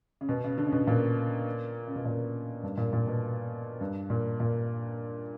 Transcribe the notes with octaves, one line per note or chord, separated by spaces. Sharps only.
C#3
B2
C#3
D3
C#3
B2
A#2
C#3
B2
A#2
G2
A#2
A#2
B2
G2
A#2
A#2